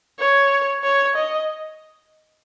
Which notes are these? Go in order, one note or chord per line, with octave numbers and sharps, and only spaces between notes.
C#5
C#5
D#5